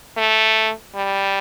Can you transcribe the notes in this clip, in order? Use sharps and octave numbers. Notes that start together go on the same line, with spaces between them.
A3
G3